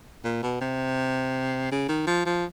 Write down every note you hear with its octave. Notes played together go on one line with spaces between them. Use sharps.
A#2
B2
C3
C#3
D#3
F3
F3